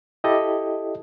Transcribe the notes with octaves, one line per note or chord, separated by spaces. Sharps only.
E4 G4 A4 D#5